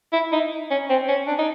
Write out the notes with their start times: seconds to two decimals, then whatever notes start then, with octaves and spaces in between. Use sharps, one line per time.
0.13 E4
0.32 D#4
0.71 C#4
0.89 C4
1.08 C#4
1.27 D4
1.39 D#4